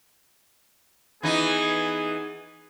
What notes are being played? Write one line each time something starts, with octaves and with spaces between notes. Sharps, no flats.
E3 B3 D#4 G#4